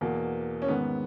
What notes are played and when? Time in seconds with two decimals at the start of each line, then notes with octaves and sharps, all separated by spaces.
0.01 E2 B2 A#3
0.62 C#4
0.68 G#2 D#3 B3